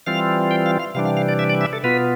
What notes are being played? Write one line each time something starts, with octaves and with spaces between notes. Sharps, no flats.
E3 G3 C4 F4 F5
G5
F5
F5
C3 E3 G3 D4 F5
F5
F5
D5
E5
D5
E5
A4
B2 B3 F4 B4